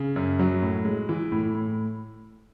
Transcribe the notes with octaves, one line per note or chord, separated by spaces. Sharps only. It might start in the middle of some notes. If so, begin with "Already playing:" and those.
Already playing: C#3
F#2
F#3
A2
G#3
E3
A2
A2